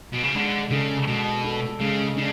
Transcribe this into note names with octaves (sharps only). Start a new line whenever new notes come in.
B2
C#3
D3 G#3
C#3 D4 A4
B2 G#3
D4 A4
C#3 G#3
C#3 D4